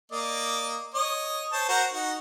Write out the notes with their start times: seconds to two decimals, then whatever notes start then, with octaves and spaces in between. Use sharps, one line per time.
0.12 A#3 D5 D#5
0.94 C#5 D#5 D#6
1.53 C5 C#5 A5
1.69 F#4 A#4 C5
1.93 D#4 F#4